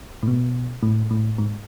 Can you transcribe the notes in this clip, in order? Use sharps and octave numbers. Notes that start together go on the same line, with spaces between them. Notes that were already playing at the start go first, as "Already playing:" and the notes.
A2
B2
A2
A2
G#2